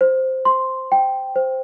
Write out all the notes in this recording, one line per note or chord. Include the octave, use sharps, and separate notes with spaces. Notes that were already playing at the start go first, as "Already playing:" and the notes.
C5
C6
G5
C5